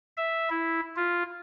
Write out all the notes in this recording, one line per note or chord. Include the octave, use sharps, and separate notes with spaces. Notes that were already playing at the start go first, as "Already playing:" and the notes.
E5
E4
F4